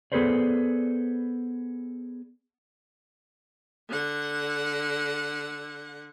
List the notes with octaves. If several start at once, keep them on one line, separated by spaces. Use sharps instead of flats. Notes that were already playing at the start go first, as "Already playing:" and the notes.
B3 G#4 A4 B4 C5 D5
D3 F#5